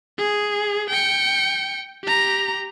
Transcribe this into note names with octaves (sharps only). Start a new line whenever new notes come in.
G#4
G5 C#7
G4 A#5